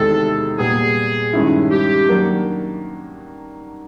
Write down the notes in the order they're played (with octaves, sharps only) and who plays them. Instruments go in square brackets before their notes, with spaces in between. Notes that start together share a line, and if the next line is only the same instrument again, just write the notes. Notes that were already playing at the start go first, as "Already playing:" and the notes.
Already playing: [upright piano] E2 C3 D#3 G#3 [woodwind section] A4
[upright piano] A#2 G3 B3 [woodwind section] G#4
[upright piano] G2 D#3 G#3 C#4 E4
[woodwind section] G4
[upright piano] D#3 F#3 A#3 D4